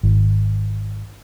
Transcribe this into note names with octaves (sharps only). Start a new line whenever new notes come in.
G#1